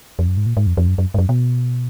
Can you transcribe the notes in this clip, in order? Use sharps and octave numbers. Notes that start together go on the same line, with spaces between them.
F2
F#2
G#2
A#2
G#2
F2
F2
F#2
F#2
G#2
F#2
B2